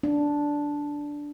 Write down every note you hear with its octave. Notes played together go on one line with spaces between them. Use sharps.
D4